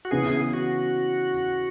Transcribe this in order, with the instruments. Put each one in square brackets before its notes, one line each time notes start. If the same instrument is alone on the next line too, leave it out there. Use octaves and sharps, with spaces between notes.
[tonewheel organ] F#4
[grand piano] C#3 E3 B3 E4 [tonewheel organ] G#4
[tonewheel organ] F#4